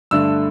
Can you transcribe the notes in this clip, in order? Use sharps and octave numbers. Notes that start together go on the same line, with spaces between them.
G2 D3 A3 E6